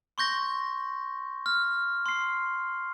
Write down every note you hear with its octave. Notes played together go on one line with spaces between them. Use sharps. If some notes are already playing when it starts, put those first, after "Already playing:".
C6 C#6 G6 A#6
F6
C6 C7